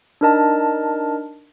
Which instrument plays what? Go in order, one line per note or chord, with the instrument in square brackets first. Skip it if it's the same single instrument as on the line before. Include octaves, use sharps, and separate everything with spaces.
[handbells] D4 D#4 A#4 D#5 A5